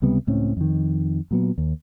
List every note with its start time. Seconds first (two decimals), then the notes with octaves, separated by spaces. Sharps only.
0.02 C#2 C3 G3 B3
0.27 C#2 A2 C4 C#4
0.57 F2 D#3
1.31 A#2 F#3 B3
1.58 D#2